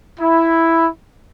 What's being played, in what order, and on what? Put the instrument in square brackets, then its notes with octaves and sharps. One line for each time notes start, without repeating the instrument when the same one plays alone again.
[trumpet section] E4